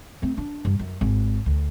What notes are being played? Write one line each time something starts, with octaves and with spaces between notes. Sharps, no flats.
A3 C4
D4
G2
F#2
G#1
D2